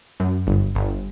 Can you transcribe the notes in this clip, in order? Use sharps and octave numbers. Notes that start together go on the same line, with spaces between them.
F#2
G1
G1